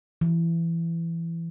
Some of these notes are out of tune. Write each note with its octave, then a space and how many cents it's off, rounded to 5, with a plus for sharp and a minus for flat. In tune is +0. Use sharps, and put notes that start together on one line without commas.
E3 +20